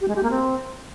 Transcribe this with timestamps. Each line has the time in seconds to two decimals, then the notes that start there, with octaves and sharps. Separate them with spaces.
0.01 G4
0.08 G#3
0.16 G4
0.23 A#3
0.31 C4